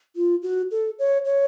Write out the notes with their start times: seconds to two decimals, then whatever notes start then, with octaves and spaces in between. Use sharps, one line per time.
0.16 F4
0.43 F#4
0.71 A4
0.99 C#5
1.25 C#5